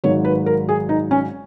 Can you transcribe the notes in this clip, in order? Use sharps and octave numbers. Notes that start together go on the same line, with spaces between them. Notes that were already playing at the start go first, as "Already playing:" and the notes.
G#1 G#2 D#3 F#3 C#5
B4
A#4
G#4
D#4
C#4